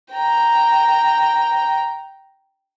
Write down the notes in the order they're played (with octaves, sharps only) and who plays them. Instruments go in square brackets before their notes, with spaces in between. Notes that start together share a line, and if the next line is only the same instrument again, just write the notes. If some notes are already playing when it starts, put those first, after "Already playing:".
[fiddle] G5 A#5